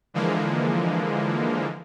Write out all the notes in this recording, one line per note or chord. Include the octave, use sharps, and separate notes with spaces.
D3 E3 F3 G#3 A#3